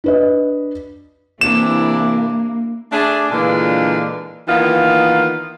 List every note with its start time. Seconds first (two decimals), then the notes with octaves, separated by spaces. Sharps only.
0.04 D4 B4 D#5
1.41 C3 E3 A#3 D4 E4 E7
2.91 A3 D4 G#4 D5
3.31 A#2 D3 E3 G#3 D4 F4
4.48 D#3 E3 A#3 B3 D#4 F4